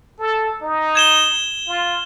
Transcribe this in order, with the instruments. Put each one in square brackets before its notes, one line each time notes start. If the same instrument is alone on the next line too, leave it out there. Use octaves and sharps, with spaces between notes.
[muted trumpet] A4
D#4
[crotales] G#6 E7 G7
[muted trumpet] F4